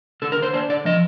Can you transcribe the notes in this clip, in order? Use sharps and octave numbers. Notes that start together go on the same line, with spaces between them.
D3 A4
A#4
D3
C5
D4 C5
D3 D5
F3 D#5